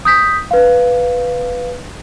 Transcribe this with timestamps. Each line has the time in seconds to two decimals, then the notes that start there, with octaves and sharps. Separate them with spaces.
0.05 D#6 G6 B6
0.51 B4 F5